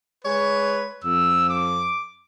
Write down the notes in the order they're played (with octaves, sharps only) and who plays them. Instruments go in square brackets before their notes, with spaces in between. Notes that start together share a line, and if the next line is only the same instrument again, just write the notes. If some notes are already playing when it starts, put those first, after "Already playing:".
[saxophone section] G#3 C#5 [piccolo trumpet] B4
[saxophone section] F2 [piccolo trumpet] E6
[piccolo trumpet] D6